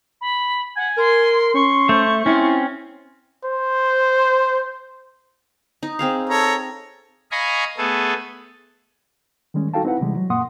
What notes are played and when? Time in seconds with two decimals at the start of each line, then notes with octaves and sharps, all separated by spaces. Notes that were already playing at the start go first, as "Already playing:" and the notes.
0.21 B5
0.77 F#5 G#5
0.98 A#4 C6
1.54 C#4 C6 C#6
1.89 A3 C5
2.26 C4 C#4 E4 F4
3.45 C5
5.83 D#4
5.99 C4 G#4 F5
6.29 A4 C#5 A#5
7.31 D#5 F5 G#5 A#5 B5 C#6
7.78 A3 B3 G#4 A4
9.54 D#3 G3 G#3 C#4
9.74 D#4 F#4 A4 F5 G5 A5
9.85 C4 D#4 E4 B4 F#5
10.01 C3 E3 G3 G#3
10.15 F#3
10.30 F#2 A#2 A#3 F#5 C6 D#6